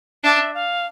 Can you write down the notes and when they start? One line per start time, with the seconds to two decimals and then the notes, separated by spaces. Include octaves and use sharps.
0.24 D4 E5
0.54 F5